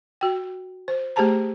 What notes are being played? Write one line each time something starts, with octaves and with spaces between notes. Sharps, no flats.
F#4 G5
C5
A3 G4 G#4 C5 A5 A#5